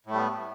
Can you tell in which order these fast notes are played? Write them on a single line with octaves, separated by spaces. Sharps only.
A2 A3 G3 B3